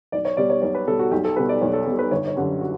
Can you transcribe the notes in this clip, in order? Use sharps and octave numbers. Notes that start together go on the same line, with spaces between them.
B1 D5
C#5
B2 G3 D5
C#5
B1 C#5
B4
B2 G3 A4
F#4
B1 G4
A4
B2 G3 B4
D5
B1 C#5
A4
B2 G3 A4
B4
G1 C#5
C#5
F#2 D3 G3
F#4